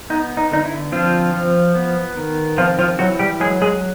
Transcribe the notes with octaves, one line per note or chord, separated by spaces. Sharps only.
B3 D#4
D#4
D3 D#4
E4
F3 C4 F4
F3
B3
D#3
F3 C4 F4
F3 F4
E3 F#3 F#4
G3 G4
F#3 G#3 G#4
G#3 G#4